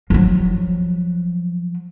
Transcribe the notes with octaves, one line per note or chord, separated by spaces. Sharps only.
F3 F#3